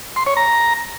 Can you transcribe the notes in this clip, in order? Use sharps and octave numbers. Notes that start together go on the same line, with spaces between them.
C6
C#5
A#5